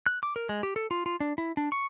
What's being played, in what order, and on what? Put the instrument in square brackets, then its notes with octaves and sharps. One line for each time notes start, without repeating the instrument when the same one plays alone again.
[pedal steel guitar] F#6
D6
A#4
G#3
G4
A4
F4
F4
D4
E4
D4
C#6